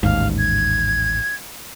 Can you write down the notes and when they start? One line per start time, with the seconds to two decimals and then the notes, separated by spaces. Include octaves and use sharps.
0.03 A1 D#2 G#2 F5
0.38 G#6